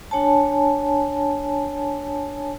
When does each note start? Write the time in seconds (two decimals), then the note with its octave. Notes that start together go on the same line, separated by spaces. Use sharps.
0.11 D4 C#5 G#5 A5